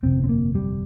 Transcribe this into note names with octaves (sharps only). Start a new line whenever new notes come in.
G1 F2 C3 C4
C4
A#3
G3